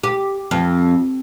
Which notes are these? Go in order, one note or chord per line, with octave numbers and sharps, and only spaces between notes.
G4
F2